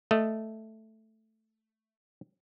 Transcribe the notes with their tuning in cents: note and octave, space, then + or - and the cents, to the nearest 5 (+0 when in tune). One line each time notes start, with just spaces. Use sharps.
A3 +0 D#5 +0